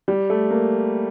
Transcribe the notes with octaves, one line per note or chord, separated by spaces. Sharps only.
G3
A3
A#3